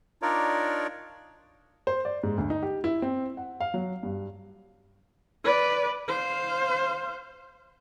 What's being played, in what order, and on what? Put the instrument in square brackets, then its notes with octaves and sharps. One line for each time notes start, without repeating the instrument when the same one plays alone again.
[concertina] D4 D#4 F4 A#4 C#5 D5
[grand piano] C5
D5
G#2
D2
D#4
G4
E4
C4
F#5
F5
F#3
G2
[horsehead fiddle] B4 D5
C5 F5